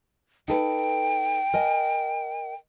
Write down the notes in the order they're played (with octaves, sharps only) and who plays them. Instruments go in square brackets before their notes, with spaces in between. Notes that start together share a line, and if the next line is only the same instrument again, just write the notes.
[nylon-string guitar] D#4 A4 B4 [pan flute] G5
[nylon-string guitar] A#4 D#5 G#5